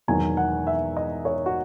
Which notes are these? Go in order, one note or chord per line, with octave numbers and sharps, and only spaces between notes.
E1 E2 D#3 F#3 G#5
F#5
E5
D#5
C#5
F#4